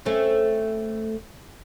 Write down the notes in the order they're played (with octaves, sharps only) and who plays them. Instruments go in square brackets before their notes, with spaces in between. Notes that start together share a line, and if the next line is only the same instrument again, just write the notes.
[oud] A3 C4 C#4